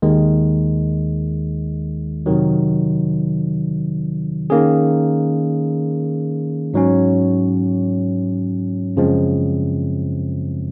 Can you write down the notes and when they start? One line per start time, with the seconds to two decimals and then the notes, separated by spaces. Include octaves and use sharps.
0.02 D#2 D#3 G#3
2.26 F2 C3 D#3 F#3
4.50 D#3 A#3 C#4 G#4
6.74 G#2 F#3 C#4
8.96 F#2 C#3 F3 G#3 C4